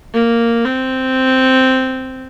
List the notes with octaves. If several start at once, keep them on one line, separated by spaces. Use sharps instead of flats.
A#3
C4